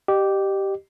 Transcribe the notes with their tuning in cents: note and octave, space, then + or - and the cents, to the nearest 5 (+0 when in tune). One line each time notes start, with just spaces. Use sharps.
G4 -10 D#5 -35